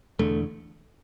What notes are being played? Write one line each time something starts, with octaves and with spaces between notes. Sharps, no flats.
E1 E2 D3 A3